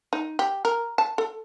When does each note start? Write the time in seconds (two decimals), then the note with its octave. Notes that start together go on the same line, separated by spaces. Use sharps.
0.13 D#4
0.39 G4
0.65 A#4
0.98 A5
1.18 A4